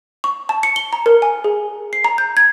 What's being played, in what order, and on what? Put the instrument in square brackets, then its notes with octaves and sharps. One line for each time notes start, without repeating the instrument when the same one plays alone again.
[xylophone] C#6
A5
C#7
G7
A#5
A#4
G#5
G#4
C7
A#5
G6
G#6